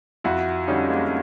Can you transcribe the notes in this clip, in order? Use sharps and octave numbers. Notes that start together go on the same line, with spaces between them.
F2 E4 F#4
D3 G3 C#4 D#4
G#3 A#3
A#3